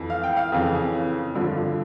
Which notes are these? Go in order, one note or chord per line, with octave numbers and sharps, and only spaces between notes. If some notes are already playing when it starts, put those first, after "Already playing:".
Already playing: F2 E3
F5
G5
F5
F2 C#3 E3
G2 D3 F3